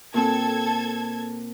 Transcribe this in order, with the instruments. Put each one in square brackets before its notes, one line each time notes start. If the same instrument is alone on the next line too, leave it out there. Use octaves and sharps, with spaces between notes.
[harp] A#2 C4 [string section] A4 G#6